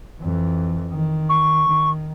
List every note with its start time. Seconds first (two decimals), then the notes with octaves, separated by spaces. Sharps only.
0.21 F2 E3
0.91 D#3
1.29 C#6
1.68 D#3